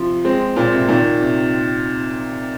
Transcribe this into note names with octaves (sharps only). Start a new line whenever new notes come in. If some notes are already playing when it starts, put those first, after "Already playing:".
Already playing: C3 F3
G#3 C4
A#2
C3
A#2 D#3
C3